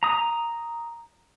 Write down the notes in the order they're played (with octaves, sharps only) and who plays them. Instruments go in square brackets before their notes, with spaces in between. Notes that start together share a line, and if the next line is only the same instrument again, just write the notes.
[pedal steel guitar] A#5 D#6